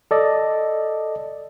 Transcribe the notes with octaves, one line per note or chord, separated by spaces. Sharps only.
A4 D5 D#5